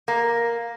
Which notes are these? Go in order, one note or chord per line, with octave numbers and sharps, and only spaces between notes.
A#3